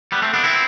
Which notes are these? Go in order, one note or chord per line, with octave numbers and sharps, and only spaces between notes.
G3 B3
A3 C4
B3 D4
C4 E4